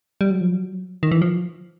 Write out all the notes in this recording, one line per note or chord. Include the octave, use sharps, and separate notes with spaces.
G3
F#3
F3
F#3
D#3
E3
F3